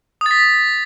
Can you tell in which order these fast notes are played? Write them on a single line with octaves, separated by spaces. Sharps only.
D#6 A6 B6